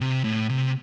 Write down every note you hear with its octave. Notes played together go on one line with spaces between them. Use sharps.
C3
A2
C3